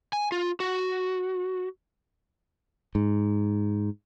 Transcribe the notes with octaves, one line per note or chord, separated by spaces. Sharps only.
G#5
F4
F#4
G#2